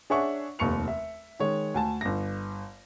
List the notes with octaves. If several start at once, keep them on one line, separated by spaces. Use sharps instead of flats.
D4 G#4 C#5 E5 F#5 C#6
F1 D#2 C#6 C#7 F7
E5
D#3 G#3 C#5
D2 G#5 A5
G1 A#6